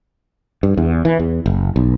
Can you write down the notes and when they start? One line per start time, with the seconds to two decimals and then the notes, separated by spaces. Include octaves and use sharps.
0.63 G2
0.77 E2
1.05 E3
1.19 E2
1.46 F#1
1.76 B1